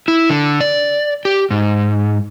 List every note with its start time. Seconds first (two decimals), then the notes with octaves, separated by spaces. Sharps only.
0.08 E4
0.30 D3
0.60 D5
1.25 G4
1.51 G#2